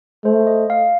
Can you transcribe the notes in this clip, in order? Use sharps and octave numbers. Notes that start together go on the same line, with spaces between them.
A3 C5
D#5
F5